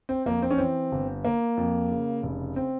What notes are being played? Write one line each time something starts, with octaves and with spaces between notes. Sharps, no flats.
C4
F2 A#3
C4
C#4
E3 C4
G1
A#3
F2
C#3
F1
C4